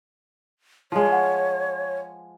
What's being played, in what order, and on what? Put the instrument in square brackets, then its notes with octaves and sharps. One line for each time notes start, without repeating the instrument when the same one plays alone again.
[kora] F3 G#3 [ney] C#5
[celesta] F#5